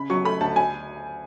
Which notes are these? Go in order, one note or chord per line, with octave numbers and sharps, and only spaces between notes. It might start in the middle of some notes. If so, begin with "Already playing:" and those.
Already playing: C#3 B5
F#3 C#6
A3 B5
D2 A5
G#5